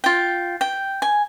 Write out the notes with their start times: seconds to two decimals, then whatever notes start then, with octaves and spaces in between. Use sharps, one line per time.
0.04 F4 G5
0.61 G5
1.02 G#5